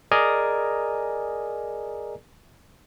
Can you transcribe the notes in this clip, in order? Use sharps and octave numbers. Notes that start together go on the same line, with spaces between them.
G#4 A#4 D5 D#5 G#5 A#5